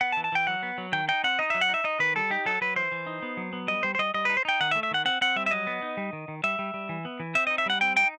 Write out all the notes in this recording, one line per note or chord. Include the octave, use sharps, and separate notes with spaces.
B3 F#5
A5
E3
A5
E3 G5
F#3 F#5
B3
F#3
D#3 G5
D#4 G5
C4 F#5
D#4 D#5
F#3 E5
F#5
D#4 E5
D#4 D#5
D#3 B4
G3 A4
D#4 G4
F#3 A4
F#3 B4
E3 C5
E3
D#4
B3
F#3
B3
G3 D#5
G3 C5
C5
G3 D#5
G3 D#5
D#4 B4
C5
D#4 G5
D#3 F#5
E5
A3
E5
D#3 F#5
C4 F#5
C4 F#5
G3 E5
E5
F#3 D#5
B3
D#4
G3
D#3
D#3
G3 E5
G3
G3
E3
B3
E3
C4 E5
D#4 D#5
E5
G3 F#5
C4 G5
D#4 G5